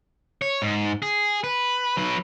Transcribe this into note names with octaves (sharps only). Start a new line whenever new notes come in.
C#5
G#2
G#4
B4
F#3 B4